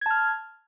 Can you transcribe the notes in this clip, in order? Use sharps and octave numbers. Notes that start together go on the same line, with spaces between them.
A5 F6 G#6